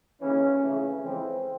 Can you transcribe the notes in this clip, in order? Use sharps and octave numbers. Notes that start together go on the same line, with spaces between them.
D#2 C#3 E3 C#4
F2 C#3 E3 A3
F2 C#3 E3 G#3 C4